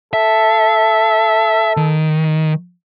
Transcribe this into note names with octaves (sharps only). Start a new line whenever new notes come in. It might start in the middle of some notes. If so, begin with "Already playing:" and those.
A4 E5
D#3